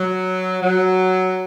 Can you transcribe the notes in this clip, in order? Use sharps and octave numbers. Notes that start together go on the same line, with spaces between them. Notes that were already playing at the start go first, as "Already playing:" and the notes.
Already playing: F#3
F#3